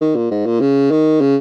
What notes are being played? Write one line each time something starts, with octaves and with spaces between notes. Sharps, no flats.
D#3
A#2
G#2
A#2
C#3
D#3
C#3